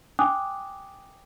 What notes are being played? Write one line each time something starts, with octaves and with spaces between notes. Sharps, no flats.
G5 G#5 D6 D#6 F#6